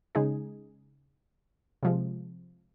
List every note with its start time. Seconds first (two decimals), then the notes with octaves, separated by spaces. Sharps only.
0.15 C#3 G#3 D#4 G#4
1.83 C3 F3 G#3